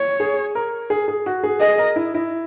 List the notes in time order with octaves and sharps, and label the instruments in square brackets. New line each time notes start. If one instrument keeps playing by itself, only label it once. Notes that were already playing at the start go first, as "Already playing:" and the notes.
Already playing: [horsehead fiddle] C#5
[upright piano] G#4
A#4
G#4
G#4
F#4
G#4
[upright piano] G#4 [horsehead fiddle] D#5
[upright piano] A#4
E4
E4